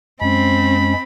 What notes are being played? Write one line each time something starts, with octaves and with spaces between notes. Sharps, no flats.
F#2 G#3 C4 C#4 B5